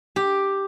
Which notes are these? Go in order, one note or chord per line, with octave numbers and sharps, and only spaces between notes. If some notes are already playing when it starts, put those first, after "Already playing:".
G4